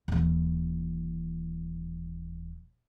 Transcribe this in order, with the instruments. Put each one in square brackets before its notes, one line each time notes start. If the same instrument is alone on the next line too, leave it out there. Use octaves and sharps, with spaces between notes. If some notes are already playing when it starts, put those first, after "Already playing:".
[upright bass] D#1 E3